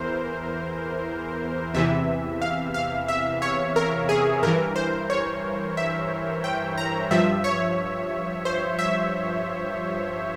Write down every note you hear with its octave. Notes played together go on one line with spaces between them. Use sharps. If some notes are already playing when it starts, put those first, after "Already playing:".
Already playing: E2 E3 A#4 C5
E2 C3 E3 E5
F5
F5
E5
C#5
A#4
G#4
G2 E3 A#4
C5
C#5
E5
G5
A#5
G2 F3 E5
C#5
C5
E5